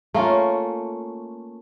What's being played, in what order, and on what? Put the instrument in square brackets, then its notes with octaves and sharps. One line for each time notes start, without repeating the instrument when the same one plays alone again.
[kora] A3 A#3 C#4 F4